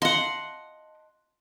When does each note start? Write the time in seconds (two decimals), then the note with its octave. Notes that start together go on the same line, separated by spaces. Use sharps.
0.02 D#5 F5 F#5 A5 C6